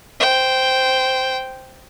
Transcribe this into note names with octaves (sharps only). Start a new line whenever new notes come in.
C5 G5